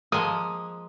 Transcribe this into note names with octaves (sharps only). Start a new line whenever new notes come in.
F3 G#3 A#3 D#6